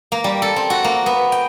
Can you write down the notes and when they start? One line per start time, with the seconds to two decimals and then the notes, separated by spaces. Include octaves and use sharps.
0.12 A#3
0.24 G3
0.42 A4
0.56 C4
0.70 F#4
0.84 A#3
1.06 B3
1.32 G5